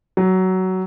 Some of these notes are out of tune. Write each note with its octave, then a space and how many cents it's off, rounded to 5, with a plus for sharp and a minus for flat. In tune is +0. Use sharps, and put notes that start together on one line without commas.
F#3 +15